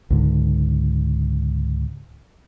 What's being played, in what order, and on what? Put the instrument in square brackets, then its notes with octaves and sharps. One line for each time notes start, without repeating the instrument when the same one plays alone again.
[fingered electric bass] C#2 G#2 D3